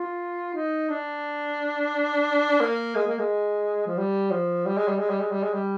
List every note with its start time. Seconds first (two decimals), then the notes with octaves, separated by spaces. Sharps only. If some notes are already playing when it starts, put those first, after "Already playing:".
Already playing: F4
0.55 D#4
0.89 D4
2.61 A#3
2.95 G#3
3.07 A#3
3.19 G#3
3.87 F3
3.98 G3
4.31 F3
4.66 G3
4.77 G#3
4.88 G3
4.99 G#3
5.10 G3
5.20 G#3
5.31 G3
5.43 G#3
5.53 G3